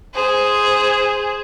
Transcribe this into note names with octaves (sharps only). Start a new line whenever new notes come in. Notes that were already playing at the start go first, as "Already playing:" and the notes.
G#4 C5